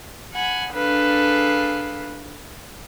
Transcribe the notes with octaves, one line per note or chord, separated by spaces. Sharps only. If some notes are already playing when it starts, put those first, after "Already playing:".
F#5 G#5 B5
D4 G#4 A4 B4 F5